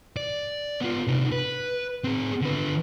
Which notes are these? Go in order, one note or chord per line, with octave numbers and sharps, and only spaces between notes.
D5
B3 F4
C3 D#4
B4
C4 G#4
D3 B4